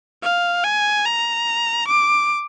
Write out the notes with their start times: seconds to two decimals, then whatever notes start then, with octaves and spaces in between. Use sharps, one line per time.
0.23 F5
0.64 G#5
1.05 A#5
1.88 D6